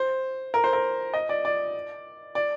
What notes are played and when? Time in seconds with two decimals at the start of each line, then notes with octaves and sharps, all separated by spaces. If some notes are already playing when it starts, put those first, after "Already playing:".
Already playing: C5
0.54 A#4
0.64 C5
0.73 A#4
1.14 D#5
1.29 D5
1.45 D5
2.35 D5